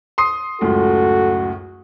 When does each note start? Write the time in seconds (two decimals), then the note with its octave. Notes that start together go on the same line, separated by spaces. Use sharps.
0.18 C6 D#6 C7
0.61 C#2 F#2 A2 F#4 A4